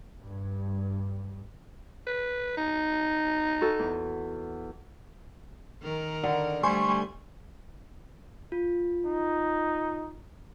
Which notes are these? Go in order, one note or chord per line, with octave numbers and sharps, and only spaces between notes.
G2
B4
D#4
F#4 A4
E2
D#3 A#4
D3
G3 A3 C5 G#5 C6 C#6
F4
D#4